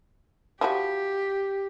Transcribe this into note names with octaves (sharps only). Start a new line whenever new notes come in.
F3 E4 F#4 G4